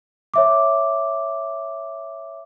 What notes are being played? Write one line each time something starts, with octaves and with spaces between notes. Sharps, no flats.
C#5 E5 D6